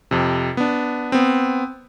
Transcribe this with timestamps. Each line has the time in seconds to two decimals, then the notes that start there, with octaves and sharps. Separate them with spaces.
0.11 F2 C3
0.57 B3 D4
1.12 B3 C4